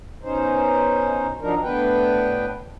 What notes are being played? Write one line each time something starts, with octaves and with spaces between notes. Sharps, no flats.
B2 C#4 D#4 C5
F3 F#3 D4 D#4 A#4
A2 B3 D4 B4 G5